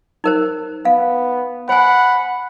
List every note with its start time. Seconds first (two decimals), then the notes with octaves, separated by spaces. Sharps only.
0.24 D#4 A#4 C5
0.85 B3 F5
1.69 C5 F#5 G#5 B5